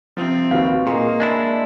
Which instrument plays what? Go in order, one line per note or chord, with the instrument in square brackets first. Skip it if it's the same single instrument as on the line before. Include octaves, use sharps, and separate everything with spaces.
[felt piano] C3 F3 [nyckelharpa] C4
[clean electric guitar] D#2 [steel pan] F#4 B4 F5
[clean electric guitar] A#2 [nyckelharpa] A#3 [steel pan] G#4 [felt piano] D#5 C6
[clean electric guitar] G#3 D4 E4